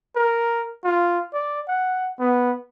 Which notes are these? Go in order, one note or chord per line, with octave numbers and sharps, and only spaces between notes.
A#4
F4
D5
F#5
B3